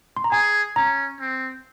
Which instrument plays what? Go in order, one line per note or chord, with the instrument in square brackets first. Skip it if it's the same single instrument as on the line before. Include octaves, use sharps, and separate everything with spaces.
[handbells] C6
A#5
[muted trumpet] G#4 [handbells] G#5
[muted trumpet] C#4 [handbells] A#5
[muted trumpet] C4